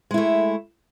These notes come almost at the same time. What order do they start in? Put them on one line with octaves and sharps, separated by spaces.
G#3 E4 A3